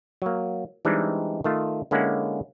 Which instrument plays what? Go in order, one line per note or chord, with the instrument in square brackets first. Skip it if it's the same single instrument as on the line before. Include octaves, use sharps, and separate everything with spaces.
[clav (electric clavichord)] F#3 A#3
E3 G3 G#3 C4 D4 D#4
D#3 A3 F4
D3 G#3 A#3 C#4 E4 F#5